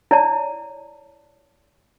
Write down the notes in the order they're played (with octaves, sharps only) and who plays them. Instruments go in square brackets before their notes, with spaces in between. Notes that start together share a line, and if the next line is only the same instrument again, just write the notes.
[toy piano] E4 C#5 D5 A5